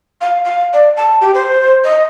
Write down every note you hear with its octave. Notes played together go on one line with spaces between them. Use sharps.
F5
F5
D5
A5
G4
C5
D#5